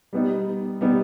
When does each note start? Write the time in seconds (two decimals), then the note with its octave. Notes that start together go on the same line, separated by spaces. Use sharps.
0.13 G3 B3 D#4
0.81 G3 B3 D#4